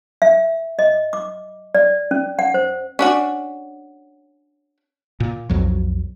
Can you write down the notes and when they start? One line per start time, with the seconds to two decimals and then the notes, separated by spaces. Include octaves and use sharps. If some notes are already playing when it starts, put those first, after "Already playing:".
0.22 E5
0.79 D#5
1.13 D6
1.75 D5
2.11 C#4
2.39 F#5
2.54 C5
2.99 C#4 D4 F#4
5.20 A#2
5.50 B1 F2 F#3